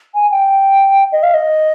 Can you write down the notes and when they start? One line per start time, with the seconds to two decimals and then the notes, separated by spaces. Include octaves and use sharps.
0.14 G#5
0.31 G5
1.12 D#5
1.23 F5
1.34 D#5